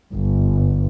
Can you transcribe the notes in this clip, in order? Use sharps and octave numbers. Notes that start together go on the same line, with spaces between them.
G1